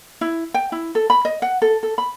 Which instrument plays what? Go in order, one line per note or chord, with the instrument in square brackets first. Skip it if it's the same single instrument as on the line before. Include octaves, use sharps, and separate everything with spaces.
[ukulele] E4
G5
E4
A4
B5
D#5
F#5
A4
A4
B5